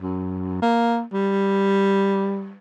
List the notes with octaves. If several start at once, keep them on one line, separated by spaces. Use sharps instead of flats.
F#2
A#3
G3